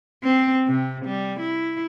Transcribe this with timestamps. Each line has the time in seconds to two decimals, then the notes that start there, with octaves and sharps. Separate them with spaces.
0.23 C4
0.68 C3
1.06 G3
1.40 E4